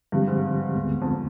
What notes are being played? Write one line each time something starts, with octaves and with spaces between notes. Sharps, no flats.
G2 D3 F3 G#3 C4 G4
G#2
D2 D3 G#3 B3
F2